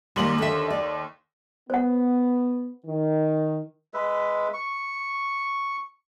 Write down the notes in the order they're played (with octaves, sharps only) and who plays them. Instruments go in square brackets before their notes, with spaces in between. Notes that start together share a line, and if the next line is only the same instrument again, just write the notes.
[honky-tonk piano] D#2 C6 F#7 [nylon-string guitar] G3 A#3
[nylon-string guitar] D3 E5
D5
[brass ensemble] B3 [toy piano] C5 F#5
[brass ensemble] D#3
[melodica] G#3 B4 E5
C#6